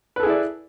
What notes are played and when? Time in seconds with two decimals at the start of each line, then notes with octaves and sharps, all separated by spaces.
0.16 B4
0.20 A4
0.23 G#4
0.26 E4
0.30 D5